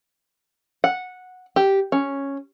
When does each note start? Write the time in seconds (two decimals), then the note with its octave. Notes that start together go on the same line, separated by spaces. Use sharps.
0.84 F#5
1.56 G4
1.92 C#4